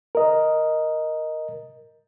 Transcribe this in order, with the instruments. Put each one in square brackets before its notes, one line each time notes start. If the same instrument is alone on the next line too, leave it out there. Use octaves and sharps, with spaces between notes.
[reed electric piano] A#4 D#5